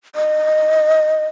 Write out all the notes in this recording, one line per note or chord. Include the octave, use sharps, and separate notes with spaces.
D#5